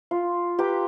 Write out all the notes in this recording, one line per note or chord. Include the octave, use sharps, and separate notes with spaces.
F4
G4 B4 G5 A#5